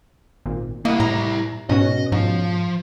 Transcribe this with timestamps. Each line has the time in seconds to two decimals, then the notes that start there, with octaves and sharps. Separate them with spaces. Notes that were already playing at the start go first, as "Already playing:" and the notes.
0.46 G#1 A#2
0.85 G3 A#3 E4 D#5 F#5
1.00 A2 A#5
1.69 G#2 B2 C#4 F#4 D#5
2.12 G#2 F3